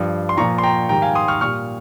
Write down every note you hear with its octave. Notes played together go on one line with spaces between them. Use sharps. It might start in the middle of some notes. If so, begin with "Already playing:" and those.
Already playing: G2 F3
C6
A#2 F3 A#5 C#6
C6
G5 A#5
G#2 D#3 G3 G5 A#5
F5 G#5
C6 D#6
C#6 F6
A#2 G3 C#6 F6